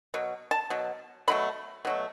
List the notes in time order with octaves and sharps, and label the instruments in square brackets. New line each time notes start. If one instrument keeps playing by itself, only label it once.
[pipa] B2 F#3
A5
B2 F#3
B2 F#3 A3 B5
B2 F#3 A3